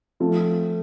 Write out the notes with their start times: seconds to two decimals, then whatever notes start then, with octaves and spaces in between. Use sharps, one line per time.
0.20 F3 A3 C4 F4